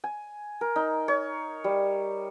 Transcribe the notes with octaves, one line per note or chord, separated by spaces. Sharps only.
G#5
A#4
D#4
C#5
G3